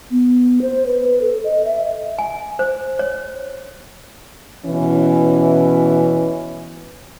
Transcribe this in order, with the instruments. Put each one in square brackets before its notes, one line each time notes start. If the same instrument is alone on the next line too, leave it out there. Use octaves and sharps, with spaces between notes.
[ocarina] B3
C5
B4
A4
D#5
E5
[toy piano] G#5
C5
C#5
[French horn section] B2 E3 C#4